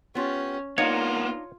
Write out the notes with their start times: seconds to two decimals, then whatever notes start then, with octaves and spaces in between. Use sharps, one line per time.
0.15 B3 C#4 F4 G4
0.78 A#3 B3 D4 D#4 F4 C#5 F5